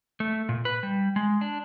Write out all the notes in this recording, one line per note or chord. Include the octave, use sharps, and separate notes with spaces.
A3
A#2
B4
G3
G#3
D4